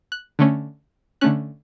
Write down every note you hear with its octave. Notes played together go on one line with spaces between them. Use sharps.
F#6
D3 A3 C#4
D3 A3 C#4 F#6